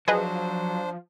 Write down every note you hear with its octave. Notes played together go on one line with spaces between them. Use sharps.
F3 F#3 D4 G#4 B4 C5 D#5